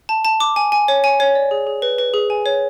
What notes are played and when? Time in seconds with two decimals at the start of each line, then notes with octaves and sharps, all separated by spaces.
0.09 A5
0.25 A5
0.40 D6
0.56 G#5
0.72 G#5
0.88 C#5
1.04 G#5
1.20 C#5
1.35 D5
1.51 G#4
1.67 G#4
1.82 B4
1.98 B4
2.14 G#4
2.30 G#5
2.46 C#5